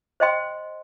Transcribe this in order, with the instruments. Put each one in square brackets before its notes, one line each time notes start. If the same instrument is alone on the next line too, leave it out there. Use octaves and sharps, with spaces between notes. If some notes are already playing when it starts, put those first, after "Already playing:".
[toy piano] C5 D#5 G5 C6